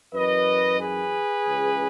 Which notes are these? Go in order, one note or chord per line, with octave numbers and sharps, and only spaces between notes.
F#2 E3 B4 D#5
G#4 B4
C#2 C#3 E3